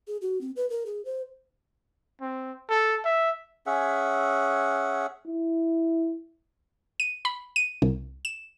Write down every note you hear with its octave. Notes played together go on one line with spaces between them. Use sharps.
G#4
F#4
C4
B4
A#4
G#4
C5
C4
A4
E5
C#4 G#4 E5 F#5
E4
D#7
B5
D#7
C2
E7